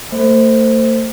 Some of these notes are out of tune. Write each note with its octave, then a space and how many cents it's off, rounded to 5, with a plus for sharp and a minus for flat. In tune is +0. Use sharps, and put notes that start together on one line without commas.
A3 +40 C5 +0